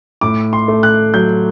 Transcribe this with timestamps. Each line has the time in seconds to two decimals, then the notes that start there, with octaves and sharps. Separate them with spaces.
0.21 A2 D6
0.53 C6
0.68 A3
0.83 F#6
1.14 F#3 G6